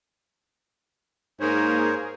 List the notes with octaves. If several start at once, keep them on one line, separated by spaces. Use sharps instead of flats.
G#2 A#3 G#4 A#4 C5 C#5